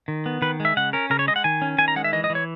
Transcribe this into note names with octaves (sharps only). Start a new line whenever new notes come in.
D#3
B3
D#3 B4
G#3
E5
C#3 F#5
C#4 A#4
C#3 A#4
C#5
G#3 D#5
F#5
D#3 G#5
C#4
D#3 G#5
A#5
G#3 F#5
E5
E3 D#5
D#5
E3
C#5